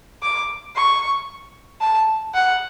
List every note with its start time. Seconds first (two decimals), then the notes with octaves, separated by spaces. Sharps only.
0.23 D6
0.76 C#6
1.81 A5
2.35 F#5